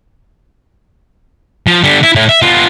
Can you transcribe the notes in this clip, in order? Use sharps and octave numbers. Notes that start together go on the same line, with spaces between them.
F3
D3 G3
E4
A2
E5
B3 F4